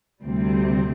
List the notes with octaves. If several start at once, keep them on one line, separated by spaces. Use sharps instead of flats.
D2 C3 G3 C4